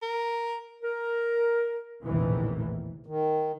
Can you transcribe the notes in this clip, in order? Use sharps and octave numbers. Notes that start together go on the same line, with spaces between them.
A#4
A#4
A#1 E2 A2 C3 D#3 E3
D#3